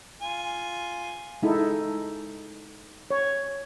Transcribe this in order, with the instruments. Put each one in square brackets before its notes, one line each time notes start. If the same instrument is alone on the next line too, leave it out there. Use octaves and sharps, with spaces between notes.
[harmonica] F4 G#5
[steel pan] G#3 D#4 E4 A4
C#5